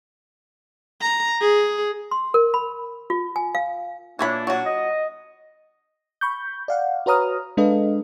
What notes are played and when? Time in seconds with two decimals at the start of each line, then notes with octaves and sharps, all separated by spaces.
1.01 A#5
1.41 G#4
2.11 C6
2.34 A#4
2.54 B5
3.10 F4
3.36 G#5
3.55 F5
4.19 A#2 E3 A#3 D4 C#5 B5
4.47 F#3 F#4
4.65 D#5
6.21 B5 C#6 G6
6.68 D5 F5 F#5
7.06 F#4 B4 C#5 A#5 D#6 F6
7.57 G#3 D4 A4 B4 D#5 F5